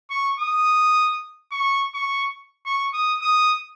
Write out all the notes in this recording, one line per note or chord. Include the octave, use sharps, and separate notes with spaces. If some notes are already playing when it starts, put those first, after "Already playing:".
C#6
D#6
C#6
C#6
C#6
D#6
D#6